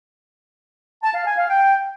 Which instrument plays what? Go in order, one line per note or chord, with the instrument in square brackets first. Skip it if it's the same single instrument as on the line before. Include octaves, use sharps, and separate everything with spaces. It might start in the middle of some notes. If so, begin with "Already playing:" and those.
[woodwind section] A5
F5
G#5
F5
G5